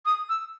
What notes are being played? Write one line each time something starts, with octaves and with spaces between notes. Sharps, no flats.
D#6
E6